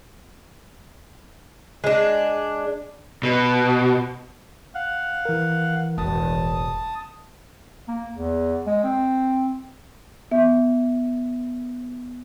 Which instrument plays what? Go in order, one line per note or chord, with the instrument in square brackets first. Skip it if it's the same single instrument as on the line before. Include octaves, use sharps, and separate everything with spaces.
[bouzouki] G#3 D4
[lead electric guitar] B2
[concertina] F5 F#5
[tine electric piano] E3 A#4
[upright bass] E1 A1 [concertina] A5 D#6
[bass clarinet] A#3
E2
G#3
C4
[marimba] B3 E5